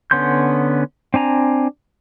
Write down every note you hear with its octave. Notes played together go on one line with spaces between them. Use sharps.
D3 B3 C#4 C6 G6
C4 D4 G#5 A#5